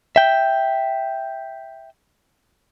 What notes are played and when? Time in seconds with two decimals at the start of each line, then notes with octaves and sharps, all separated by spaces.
0.16 E5 G5